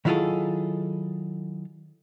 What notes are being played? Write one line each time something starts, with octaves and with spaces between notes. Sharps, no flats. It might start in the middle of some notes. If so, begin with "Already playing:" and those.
D#3 F#3 E4 F4 G#4 A4